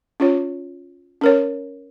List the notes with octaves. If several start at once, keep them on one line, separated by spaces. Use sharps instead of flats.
C#4 F4 C#5
C#4 A#4 C#5